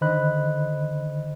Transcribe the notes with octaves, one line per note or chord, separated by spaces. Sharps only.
D3 D#3 C5 D#5 B5 F#6